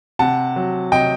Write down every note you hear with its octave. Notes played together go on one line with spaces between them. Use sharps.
C3 F#5 A5
F#3
C3 D#5 G5